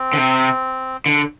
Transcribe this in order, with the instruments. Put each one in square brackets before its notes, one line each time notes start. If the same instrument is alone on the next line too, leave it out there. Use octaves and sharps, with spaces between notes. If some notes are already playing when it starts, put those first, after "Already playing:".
Already playing: [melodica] C4
[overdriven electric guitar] D3
C3
D3